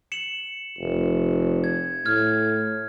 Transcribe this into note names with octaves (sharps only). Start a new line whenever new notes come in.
C#7 E7 F#7
F1
G#6
A2 F6 G#6